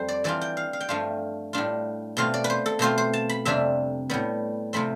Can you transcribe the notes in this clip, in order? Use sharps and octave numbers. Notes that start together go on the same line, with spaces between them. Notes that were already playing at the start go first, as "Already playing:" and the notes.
Already playing: F2 G3 C4 A4 C5
D5
E3 G3 D4 F4 D5
G5
F5
F5
G5
G2 F3 A3 D4 F4 F5
A2 G3 D4 F4
B2 A3 C4 F4 F5
D5
B4
C5
A4
B2 A3 C4 F4 C5
C5
A5
B5
F2 C3 G3 D4 E5
A2 G3 B3
C3 F3 A3 C4 B5